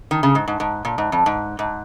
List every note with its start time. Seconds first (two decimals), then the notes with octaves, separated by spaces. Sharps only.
0.11 D#3
0.23 C#3
0.35 G#2
0.48 G#2
0.60 G#2
0.85 A#2
0.98 G#2
1.12 F2
1.26 G#2
1.59 G#2